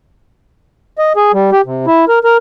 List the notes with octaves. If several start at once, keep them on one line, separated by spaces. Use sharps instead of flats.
D#5
G#4
G3
G4
C3
E4
A#4
A#4